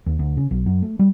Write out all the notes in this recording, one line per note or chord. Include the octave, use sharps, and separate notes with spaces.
D#2
D2
C#3
B1
F#2
A3
G3